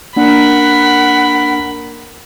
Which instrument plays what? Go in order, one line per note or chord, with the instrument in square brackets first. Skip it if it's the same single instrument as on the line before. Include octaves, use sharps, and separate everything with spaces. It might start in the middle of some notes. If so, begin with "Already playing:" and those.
[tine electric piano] A#3 D4 [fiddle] A#4 B5 [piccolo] F#5